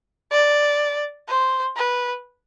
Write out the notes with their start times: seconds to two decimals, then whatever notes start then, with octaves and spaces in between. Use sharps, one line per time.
0.32 D5
1.28 C5
1.76 B4